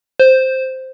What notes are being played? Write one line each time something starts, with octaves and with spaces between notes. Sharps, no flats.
C5